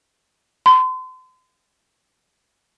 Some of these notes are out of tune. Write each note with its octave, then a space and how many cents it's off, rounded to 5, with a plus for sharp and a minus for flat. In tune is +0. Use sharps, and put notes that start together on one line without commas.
C6 -35